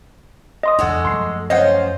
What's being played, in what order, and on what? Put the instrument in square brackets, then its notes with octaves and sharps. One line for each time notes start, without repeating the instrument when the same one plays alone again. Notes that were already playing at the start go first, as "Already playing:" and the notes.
[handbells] D#5 C6 D#6
[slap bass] E2 D4 [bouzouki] G#3 F#4 A4
[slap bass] F#2 F3 A3 [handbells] C6 C7
[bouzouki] C#4 F4 C5 [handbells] D#5 F#5